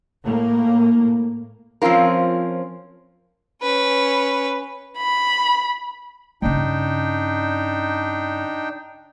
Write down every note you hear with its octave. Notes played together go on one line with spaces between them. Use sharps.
A2 A#3
F3 C4 C#4 F4 A#4
C#4 B4
B5
G2 C#3 D4 D#4 G5